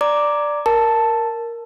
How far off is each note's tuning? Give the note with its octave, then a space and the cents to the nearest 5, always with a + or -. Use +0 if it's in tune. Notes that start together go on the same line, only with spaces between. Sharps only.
D5 +0 A#5 +0 D6 +0
A#4 +0 A5 +0